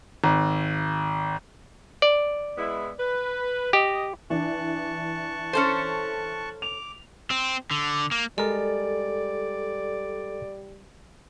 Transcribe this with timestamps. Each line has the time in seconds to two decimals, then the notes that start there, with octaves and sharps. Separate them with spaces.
0.24 G#1
2.02 D5
2.57 G#3 B3 E4
2.99 B4
3.73 G4 D#5
4.30 E3 D4 A5 C#6 F#6
5.53 C#4 A4 C5
6.62 D6 F7
7.30 C4
7.71 D3
8.11 A#3
8.38 G3 G#3 A4 A#4 D5